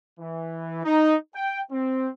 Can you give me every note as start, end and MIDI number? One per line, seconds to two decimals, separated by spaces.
0.20 0.84 52
0.84 1.15 63
1.35 1.60 79
1.72 2.08 60